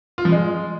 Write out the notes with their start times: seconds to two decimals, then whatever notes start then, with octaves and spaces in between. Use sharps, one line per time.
0.18 F4
0.25 F3
0.32 G#3